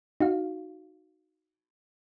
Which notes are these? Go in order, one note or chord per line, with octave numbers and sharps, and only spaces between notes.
D#4 F#4 F5